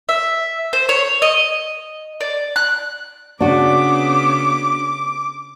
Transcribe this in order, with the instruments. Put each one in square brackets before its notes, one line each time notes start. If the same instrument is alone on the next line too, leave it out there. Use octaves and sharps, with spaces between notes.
[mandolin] E5
C5
C#5
D#5
D5
F#6
[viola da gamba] C#3 B3 [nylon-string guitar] D4 F#4 [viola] D6